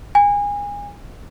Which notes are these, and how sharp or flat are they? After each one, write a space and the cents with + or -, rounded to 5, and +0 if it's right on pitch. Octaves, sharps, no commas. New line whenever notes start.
G#5 -30